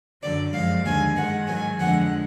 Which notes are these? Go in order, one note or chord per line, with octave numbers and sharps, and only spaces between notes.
F#2 D3 F#3 D5
F#2 F3 G#3 F5
D#2 D3 G#3 G#5
G#2 D#3 G#3 F#5
G#2 D#3 F#3 G#5
F2 D3 F3 G#3 F#5